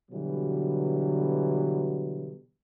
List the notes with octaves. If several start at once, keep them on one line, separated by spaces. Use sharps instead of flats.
B2 D3 E3 F#3 G3